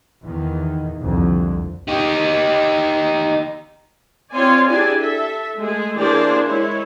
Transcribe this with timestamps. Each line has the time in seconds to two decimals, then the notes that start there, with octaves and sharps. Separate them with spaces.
0.23 E2 D#3
1.00 C2 F2 D3
1.89 D#4 G4
4.33 C4 F4 C#5 D5 G#5 C6
4.68 D4 E4 G4 G#4 D5 G#5
4.98 A4 E5
5.58 G#3 A3 G#4
5.97 E3 A#3 D4 G#4 C5 D5
6.44 G#3 E4 C#5